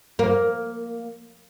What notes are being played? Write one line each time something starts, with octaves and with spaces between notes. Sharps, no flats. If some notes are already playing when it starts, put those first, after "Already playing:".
A#3